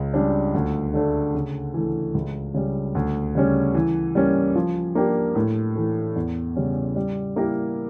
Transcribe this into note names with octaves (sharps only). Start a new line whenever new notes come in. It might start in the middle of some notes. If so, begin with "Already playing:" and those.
Already playing: C#2
C#3 G3 D4
D2
D3 A3 D4
C#3
E3 A3
C#2
C#3 G3
D2
C#3 G3 C#4
E3
G3 A#3 C#4
F3
A#3 D4 G4
A2
E3 A3
E2
C#3 G3 C#4
G3
A#3 E4 G4 A#4